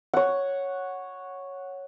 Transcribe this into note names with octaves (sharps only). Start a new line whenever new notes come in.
C#5 F#5